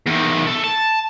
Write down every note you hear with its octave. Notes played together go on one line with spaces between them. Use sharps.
E2 D#3
A3
A5